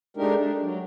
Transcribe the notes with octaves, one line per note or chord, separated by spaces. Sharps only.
G#3 A3 D4 D#4 G4 A#4
D4
F#3